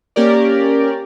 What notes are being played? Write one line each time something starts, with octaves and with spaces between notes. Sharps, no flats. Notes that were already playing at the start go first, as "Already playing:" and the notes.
A#3 C#4 G4 A#4 D5